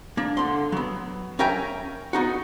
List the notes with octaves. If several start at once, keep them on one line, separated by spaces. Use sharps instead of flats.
A#3 D4
D3 C6
F#3 B3
C#4 A#4 E5 G5 G#5 A#5
B3 D#4 F#4